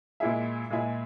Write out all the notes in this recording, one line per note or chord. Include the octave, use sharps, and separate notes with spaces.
A#2 G#3 E4 G#4 E5
A#2 G#3 E4 G#4 E5